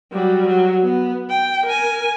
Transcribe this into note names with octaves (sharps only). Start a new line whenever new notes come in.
F#3 G3
F#3
B3
G5
A#4 G#5